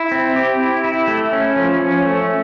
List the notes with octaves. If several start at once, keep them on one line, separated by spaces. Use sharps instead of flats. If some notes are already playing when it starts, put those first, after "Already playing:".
Already playing: E4
C4
G4
E4
E4
A3
C#4
F3
C#4
A3